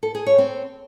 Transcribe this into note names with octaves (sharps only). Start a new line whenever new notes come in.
A4
G#4
C#5
C4